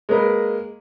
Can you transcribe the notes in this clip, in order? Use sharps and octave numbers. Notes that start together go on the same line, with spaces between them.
G#3 A#3 A#4 B4